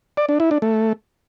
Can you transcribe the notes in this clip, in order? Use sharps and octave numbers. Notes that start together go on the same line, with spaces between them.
D5
D4
E4
D4
A3